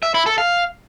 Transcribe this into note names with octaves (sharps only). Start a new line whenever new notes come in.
E5
E4
A4
F5